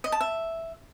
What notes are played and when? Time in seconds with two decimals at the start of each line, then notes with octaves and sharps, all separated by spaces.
0.04 D#5
0.12 A5
0.21 E5